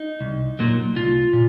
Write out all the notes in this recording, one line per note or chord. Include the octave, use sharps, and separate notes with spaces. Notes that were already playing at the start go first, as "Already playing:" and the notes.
Already playing: D#4
C2
A#2 F#3 A#3
C2 F4
A#2